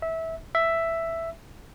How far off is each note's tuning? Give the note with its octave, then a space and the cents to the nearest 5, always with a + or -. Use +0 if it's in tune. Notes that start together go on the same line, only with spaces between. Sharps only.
E5 -20
E5 +5